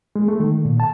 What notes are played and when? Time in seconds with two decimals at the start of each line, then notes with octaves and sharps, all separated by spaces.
0.16 G#3
0.28 A3
0.40 D#3
0.65 A#2
0.80 A5